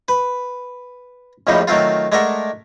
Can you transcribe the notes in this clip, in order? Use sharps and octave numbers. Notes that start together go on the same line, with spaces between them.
B4
A#1 F2 A2 F3 G3 D#4
D#3 F#3 A3 C4 F4
G#3 A3 D4 A#4 E5 F#5